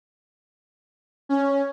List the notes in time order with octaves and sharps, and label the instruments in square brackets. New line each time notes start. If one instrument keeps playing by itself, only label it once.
[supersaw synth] C#4